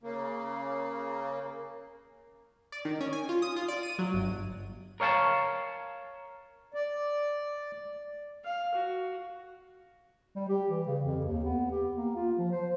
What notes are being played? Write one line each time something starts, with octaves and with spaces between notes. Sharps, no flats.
C#3 A#3
D5
D#3
C#4
G#5
F4
D#6
F4
D5
D#7
F#3
G1
A#4 C#5 F5 G#5 A5
D5
F5
F#4
G3
G4
E3
C#3
F2
D#2
B3
G4
A#3
F4
F3
C5